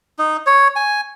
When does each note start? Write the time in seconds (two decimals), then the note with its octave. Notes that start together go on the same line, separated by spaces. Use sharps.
0.19 D#4
0.46 C#5
0.76 G#5